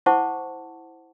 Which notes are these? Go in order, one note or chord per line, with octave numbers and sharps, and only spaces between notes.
E4 C5 F#5 A5 C#6 D6